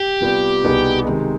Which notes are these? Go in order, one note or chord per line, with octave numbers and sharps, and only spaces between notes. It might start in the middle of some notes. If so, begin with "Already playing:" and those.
Already playing: G4
C3 G3 B3 F4
C2 B2 B3 D#4 G#4
C3 D#3 G#3